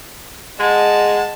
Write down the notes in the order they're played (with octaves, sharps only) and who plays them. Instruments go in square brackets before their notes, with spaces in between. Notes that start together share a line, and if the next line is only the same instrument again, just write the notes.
[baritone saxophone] G#3 [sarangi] D#5 [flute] F#5 [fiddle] A5